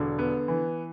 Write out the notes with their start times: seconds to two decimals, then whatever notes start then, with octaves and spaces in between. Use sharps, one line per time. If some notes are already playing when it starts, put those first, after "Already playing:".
Already playing: E1 D3
0.19 B3
0.48 E3